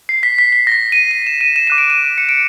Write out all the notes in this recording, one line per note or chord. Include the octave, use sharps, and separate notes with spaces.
C7
B6
B6
B6
A#6
B6
D#7
D#7
E7
D#7
E7
D6 F#6 D#7
D7
D#7
C#7
D7